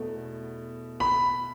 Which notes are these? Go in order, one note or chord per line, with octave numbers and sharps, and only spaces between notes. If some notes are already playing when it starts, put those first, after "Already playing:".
Already playing: E2 B2 A3
B5